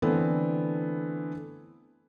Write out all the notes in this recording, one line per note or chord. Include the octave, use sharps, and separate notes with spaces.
D3 E3 A3 B3 C4